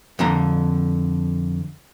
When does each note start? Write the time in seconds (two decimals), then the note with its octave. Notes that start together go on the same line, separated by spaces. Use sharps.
0.19 F2 D3 A#5